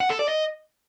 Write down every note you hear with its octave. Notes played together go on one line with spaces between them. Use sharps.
F#5
A4
D5
D#5